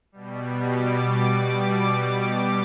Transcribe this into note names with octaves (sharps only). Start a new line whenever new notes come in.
B2 G3
D6
B2 G3 D6